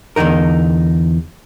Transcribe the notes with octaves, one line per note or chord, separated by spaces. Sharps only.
E2 A#2 D3 D#4 A#4